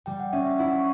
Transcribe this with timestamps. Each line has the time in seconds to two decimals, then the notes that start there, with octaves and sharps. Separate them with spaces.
0.06 G3 G5
0.20 F#5
0.33 C#4 E5
0.45 E5
0.59 E4 F#5
0.76 C#6